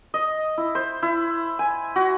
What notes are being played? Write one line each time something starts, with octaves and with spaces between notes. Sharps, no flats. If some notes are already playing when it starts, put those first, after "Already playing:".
D#5
E4
C5
E4
G#5
F#4